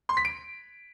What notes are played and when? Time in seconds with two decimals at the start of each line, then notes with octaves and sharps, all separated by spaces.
0.09 C6
0.17 B6
0.25 D7